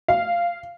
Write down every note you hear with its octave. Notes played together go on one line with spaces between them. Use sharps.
F5